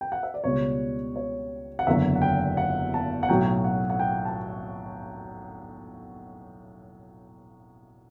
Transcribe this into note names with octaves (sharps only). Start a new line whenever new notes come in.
G5
F#5
E5
D5
C#2 B2 G3 C#5
C#5
F#5
F#1 E2 D3 F#3 E5
F#5
G5
F#5
A5
F#5
B1 A2 F#3 G5
F#5
F#5
G5
A5